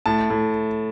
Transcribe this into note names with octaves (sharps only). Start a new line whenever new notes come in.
A2 A5
A2